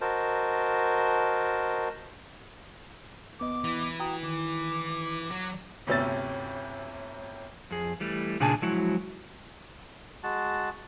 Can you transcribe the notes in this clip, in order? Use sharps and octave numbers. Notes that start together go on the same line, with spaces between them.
F#4 A#4 C5 D#5 A5
D#2 B3 D#5 D6
E3
F#4 G5 A#5 D#6
D#3 D6
F#3
G1 D2 C3 C#4 E6 A6
F2 G#4
E3 G3 A3
A#2 C#3 D4 G#4 G#5 A5
F3 F#3 G#3 E4 F#4
G#3 F#4 A5